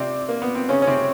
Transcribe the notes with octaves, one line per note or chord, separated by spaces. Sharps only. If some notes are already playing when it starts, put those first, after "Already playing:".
Already playing: C3 C4 D5
A#3
B3
C4
C#3 C#4 C#5
C#4
C3 C4